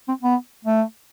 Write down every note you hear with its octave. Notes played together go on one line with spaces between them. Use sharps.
C4
B3
A3